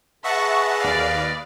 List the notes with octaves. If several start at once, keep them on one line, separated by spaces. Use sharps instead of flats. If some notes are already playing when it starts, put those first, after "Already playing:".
G#4 B4 D#5 E5 F#5 A5 C#6
D#2 D5 F5